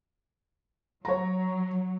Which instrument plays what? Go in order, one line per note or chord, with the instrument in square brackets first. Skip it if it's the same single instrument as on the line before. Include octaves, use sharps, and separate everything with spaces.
[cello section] F#3 [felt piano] C#5 A#5